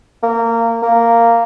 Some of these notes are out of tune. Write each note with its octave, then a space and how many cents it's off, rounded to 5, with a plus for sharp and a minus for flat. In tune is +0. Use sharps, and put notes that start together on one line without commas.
A#3 -20
A#3 -10